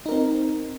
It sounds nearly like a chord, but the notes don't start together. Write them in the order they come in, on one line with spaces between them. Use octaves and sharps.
D#4 A#4 C4